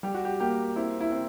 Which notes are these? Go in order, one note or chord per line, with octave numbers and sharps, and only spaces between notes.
G3 G4
F#4
G4
A#3 G4
C4 E4
E4
C4